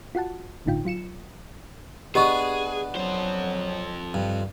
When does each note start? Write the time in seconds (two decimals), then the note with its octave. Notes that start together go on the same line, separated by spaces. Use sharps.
0.15 F4 F#4 F#5 A5
0.65 G1 A2 D3 D#4 F4 G5
0.85 F#3 F4 C#7 E7
2.15 B3 D4 G4 G#4 D#5 C#6
2.96 F2 F#3 C5
4.14 G2